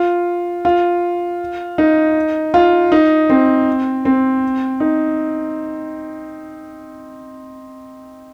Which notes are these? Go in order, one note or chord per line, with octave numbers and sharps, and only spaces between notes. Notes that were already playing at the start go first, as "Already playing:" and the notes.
Already playing: F4
F4
D#4
F4
D#4
C4
C4
D#4